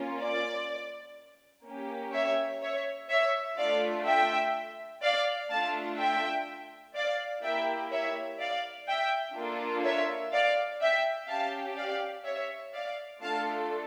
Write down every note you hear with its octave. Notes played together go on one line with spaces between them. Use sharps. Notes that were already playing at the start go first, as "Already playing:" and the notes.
Already playing: A#3 C#4 F4
D5
A#3 C#4 G4
C#5 E5
C#5 E5
C#5 E5
A3 D4 F4 D5 F5
E5 G5
D5 F5
A3 D4 F4 F5 A5
E5 G5
D5 F5
A#3 E4 G4 E5 G5
C#5 E5
D5 F5
E5 G5
A#3 D4 F4 A4
C#5 E5
D5 F5
E5 G5
C#4 G4 F5 A5
D5 F5
C#5 E5
D5 F5
A3 D4 F4 A4 F5 A5